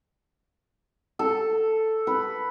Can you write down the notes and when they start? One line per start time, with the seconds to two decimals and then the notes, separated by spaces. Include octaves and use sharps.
1.19 A4
2.07 B4